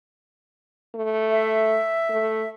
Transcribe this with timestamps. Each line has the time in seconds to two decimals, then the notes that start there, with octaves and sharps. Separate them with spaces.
0.95 A3
1.31 E5
2.10 A3